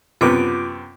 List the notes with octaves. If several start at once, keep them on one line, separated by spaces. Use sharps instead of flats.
F#2 C3 B3 F4 D6 D7